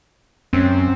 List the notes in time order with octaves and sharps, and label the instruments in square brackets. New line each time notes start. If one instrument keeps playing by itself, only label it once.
[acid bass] F#2 [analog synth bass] C4 [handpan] C#4